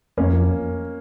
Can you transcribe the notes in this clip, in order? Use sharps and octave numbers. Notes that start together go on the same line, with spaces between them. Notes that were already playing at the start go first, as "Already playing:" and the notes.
F2 A#3 C#4
F3